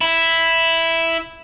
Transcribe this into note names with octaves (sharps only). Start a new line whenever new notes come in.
E4